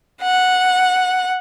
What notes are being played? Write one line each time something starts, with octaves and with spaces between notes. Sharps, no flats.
F#5